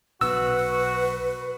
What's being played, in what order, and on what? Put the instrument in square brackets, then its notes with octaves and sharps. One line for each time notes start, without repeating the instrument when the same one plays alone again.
[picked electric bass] B1 B2 [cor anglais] F#4 [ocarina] B4 [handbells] E6